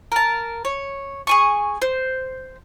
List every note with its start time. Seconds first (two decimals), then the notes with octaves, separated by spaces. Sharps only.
0.12 A#4 A5
0.65 C#5
1.27 G#4 G#5 C#6
1.82 C5